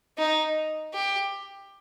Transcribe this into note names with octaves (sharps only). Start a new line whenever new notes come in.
D#4
G4